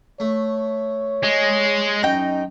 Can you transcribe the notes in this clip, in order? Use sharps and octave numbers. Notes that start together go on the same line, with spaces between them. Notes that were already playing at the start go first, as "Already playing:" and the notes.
A3 C#5
G#3
F#2 D#4 G5